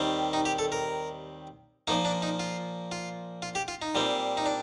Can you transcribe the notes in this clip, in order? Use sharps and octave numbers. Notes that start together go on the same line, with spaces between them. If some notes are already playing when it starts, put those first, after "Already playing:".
Already playing: D#2 D#3 G3 C4
D#4
G4
A4
A#4
A#2 F3 A#3 D#4
D4
D#4
F4
F4
F4
G4
F4
D#4
A#2 G3 C4
D#4
D4